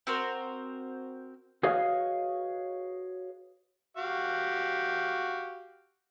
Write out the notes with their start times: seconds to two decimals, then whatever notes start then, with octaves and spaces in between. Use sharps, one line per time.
0.07 C4 F#4 A#4 C5
1.63 F#4 G#4 B4 C#5 D#5 F5
3.97 F#4 G4 F5